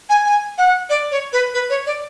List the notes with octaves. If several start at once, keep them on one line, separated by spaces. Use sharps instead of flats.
G#5
G#5
F#5
D5
C#5
B4
B4
C#5
D5